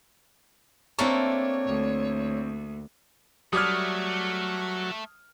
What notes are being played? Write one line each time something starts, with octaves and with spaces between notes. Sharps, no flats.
A3 A#3 C4 D4 C#5 C#6
D2
F#3 G3 A3 D6 D#6 F6 G#6